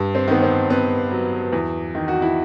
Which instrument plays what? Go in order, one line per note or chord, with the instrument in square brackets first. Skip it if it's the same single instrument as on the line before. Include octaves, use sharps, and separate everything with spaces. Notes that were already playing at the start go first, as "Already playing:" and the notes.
Already playing: [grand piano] G2
[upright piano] C4
[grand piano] D#3 [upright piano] B3
[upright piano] C4
[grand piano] B3 [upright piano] C4
[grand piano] F#3
E2
D#3
[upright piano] F#4
E4